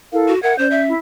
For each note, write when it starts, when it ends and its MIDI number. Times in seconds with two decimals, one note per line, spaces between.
0.13 0.33 64
0.13 0.33 69
0.13 0.33 70
0.13 0.33 77
0.28 0.41 66
0.43 0.54 70
0.43 0.53 76
0.43 0.58 78
0.43 0.53 92
0.58 0.93 61
0.58 0.67 72
0.58 0.81 74
0.58 0.81 91
0.71 0.89 76
0.87 0.97 64